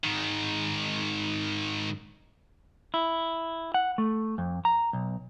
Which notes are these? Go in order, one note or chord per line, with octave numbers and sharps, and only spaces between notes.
G#2 D#3
E4
F#5
A3
F2
A#5
B1